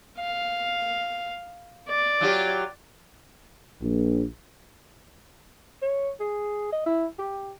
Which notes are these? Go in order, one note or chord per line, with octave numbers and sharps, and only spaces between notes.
F5
D5
F#3 F4 G4
A#1
C#5
G#4
D#5
E4
G4